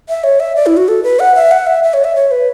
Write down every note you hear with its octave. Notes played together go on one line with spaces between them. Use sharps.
E5
C#5
E5
D5
E4
F#4
A4
B4
F#5
E5
F#5
E5
E5
C#5
E5
C#5
B4